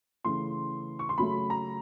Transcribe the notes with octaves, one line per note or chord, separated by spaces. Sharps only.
C#3 E3 A3 C6
C#6
C6
C#3 F#3 A3 B5
A#5